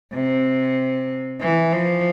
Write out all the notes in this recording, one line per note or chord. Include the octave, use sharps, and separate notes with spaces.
C3
E3
F3